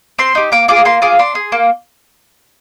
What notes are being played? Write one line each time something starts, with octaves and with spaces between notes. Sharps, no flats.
C4 C6
D#4 G4
A#3 D6
F4 G#4 D6
A#3 C6
F4 G#4 D6
D4 C6
G#4
A#3